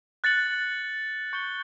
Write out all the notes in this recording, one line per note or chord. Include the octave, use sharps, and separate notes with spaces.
F#6 A6 C#7 F#7
C#6 G6 C#7 G7